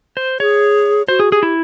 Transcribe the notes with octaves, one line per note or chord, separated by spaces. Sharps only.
C5
G#4 C#5
F#4 C5
G#4
G4 G#4
E4